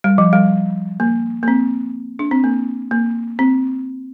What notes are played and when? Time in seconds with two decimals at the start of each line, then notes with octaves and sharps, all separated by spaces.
0.04 G3
0.18 F3
0.33 G3
1.00 A#3
1.43 A#3
1.48 C4
2.19 D4
2.31 C4
2.44 A#3
2.91 A#3
3.39 C4